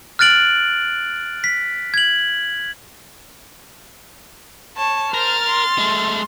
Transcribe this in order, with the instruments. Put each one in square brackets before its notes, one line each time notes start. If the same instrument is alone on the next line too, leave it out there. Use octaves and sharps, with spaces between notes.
[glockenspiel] F6 F#6 A6 D7 F#7
B6
G#6 F#7
[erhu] C#5 [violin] A5
[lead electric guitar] A#4 [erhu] C5 [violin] F6 A6
[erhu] C6
[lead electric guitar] G#3 A3